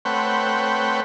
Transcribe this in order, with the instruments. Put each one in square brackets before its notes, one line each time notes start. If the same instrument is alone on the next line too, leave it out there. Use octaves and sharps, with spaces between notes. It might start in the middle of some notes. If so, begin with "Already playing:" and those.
[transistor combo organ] A3 C4 B4 C#5 F#5 G5